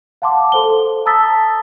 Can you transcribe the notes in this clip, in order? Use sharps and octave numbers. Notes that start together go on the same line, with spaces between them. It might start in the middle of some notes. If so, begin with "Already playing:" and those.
F5 F#5 A5 C6 D6
A4 C5 G7
A5 A#5 D#6 E6 A6 B6